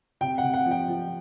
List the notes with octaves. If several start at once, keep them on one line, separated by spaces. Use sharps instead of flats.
C3 G5
C3 F#5
F#5
F3
G5
F3